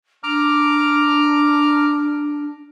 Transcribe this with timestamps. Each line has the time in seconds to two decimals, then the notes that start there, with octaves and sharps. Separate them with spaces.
0.23 D4 A#5 D6 F6